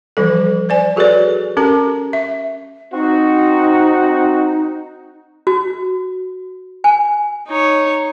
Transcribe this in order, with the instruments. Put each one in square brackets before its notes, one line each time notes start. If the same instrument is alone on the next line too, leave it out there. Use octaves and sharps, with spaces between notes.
[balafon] E3 F3 G3 A4
C5 D5 G#5
F#4 G#4 A4 B4 C#5 D5
C#4 G4 A4 A#4 A#5
E5
[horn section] C4 F#4 [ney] D#4
[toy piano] F#4
G#5
[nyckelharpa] D#4 C#5